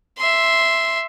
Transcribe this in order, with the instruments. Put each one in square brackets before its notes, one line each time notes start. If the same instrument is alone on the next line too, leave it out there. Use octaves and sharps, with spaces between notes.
[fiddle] E5 C6